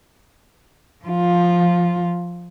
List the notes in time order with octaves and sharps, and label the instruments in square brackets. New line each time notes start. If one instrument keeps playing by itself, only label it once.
[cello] F3 F4